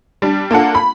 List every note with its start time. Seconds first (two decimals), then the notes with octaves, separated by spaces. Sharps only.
0.22 G3 D4
0.51 A#3 D4 F4 A4 F#5
0.75 B5